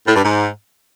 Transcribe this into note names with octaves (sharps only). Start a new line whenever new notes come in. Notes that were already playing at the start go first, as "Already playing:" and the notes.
A2
G2
G#2